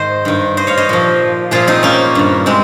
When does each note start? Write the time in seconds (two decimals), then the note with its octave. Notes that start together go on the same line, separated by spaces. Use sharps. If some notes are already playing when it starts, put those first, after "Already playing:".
Already playing: G#2 D#3 C5 D#5
0.25 G2 D#3
0.57 C5 D#5
0.67 C#5 F5
0.77 C5 D#5
0.89 A#2 F3
1.51 A#2 F3 F4 G#4
1.67 C4 D#4
1.83 A#3 C#4
2.15 G2 D#3
2.46 G#3 C4